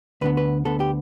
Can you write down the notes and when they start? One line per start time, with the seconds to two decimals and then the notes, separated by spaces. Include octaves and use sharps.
0.21 D2 D3 B3 B4
0.37 B4
0.65 D2 D3 B3 A4
0.80 G4